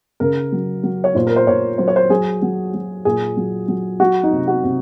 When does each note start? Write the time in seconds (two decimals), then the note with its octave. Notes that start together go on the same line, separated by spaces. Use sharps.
0.20 C#3 A#4
0.52 F#3
0.83 F#3
1.04 C#5
1.15 A#2 C5
1.27 A#4
1.36 C5
1.47 A#2 C#5
1.78 F#3 C5
1.88 C#5
1.96 C5
2.10 F#3 G#4
2.42 F#3
2.74 F#3
3.05 A#2 G#4
3.37 F#3
3.68 F#3
4.00 F#3 F#4
4.23 D#4
4.32 C3
4.47 F#4
4.64 C3